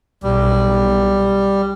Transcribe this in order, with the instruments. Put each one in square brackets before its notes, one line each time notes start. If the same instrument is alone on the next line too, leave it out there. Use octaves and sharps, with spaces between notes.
[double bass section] B1 [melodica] G3